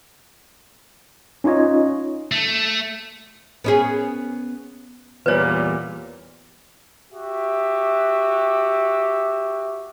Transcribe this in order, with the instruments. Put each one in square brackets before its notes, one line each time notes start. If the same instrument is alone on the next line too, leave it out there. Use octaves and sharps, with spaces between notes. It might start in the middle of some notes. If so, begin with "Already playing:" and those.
[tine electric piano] C#4 D#4 F4 C#5 D#5
[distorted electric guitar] A3
[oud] B3 C#4 G#4
[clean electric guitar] E2 G3 [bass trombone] A#2 [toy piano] B4 C#5
[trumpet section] F#4 G4 E5